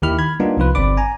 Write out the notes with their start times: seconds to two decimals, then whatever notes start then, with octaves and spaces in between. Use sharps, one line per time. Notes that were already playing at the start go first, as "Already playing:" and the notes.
0.02 D#2 D#3 E4 G4 B5 F6
0.19 B5 G#6
0.40 G3 A#3 B3 D4 D#4 F4
0.57 C2 F3 F4 B4
0.75 G1 C4 D5 B5 D6
0.97 G#5 A#5